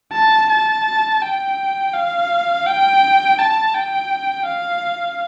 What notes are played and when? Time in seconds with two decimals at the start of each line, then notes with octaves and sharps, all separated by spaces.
0.13 A5
0.50 A5
1.22 G5
1.93 F5
2.66 G5
3.38 A5
3.74 G5
4.46 F5